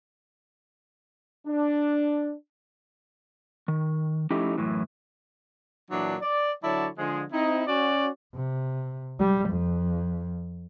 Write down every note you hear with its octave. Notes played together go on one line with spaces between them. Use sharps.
D4
D#3
F3 A3 C#4 D#4 E4 G4
F#2 A2 E3
A#2 E3 F#3 D4
D5
D3 F#3 E4 C#5 D5 A5
D3 F3 G#3
C4 D#4 E4
C#4 F#4 D5
C3
G3
F2